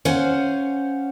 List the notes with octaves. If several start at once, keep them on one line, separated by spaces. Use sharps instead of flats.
C#4 C5 F5 F#5 G#5